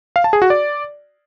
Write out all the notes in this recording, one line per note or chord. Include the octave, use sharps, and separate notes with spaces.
F5
A5
G#4
F#4
D5